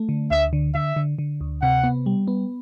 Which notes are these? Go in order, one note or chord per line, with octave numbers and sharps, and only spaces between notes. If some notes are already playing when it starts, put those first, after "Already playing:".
Already playing: A3
D3
D2 E5
D3
D3 E5
D3
D3
D2
C3 F#5
B3
G3
B3